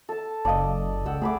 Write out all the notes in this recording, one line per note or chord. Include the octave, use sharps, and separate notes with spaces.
A4 A5
F#1 D5 D#5 F5 A5
C#2 F#5 G5 E6
A3 G#4 B5 D6